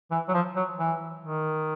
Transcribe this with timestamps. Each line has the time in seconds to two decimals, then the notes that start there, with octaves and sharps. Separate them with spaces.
0.11 E3
0.28 F#3
0.33 F3
0.56 F#3
0.78 E3
1.24 D#3